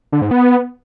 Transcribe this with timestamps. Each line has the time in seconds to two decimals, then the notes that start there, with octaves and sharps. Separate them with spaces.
0.12 D3
0.22 G#2
0.31 B3